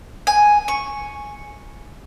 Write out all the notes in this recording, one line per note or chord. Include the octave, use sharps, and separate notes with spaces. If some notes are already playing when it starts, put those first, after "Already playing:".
G#5
C#6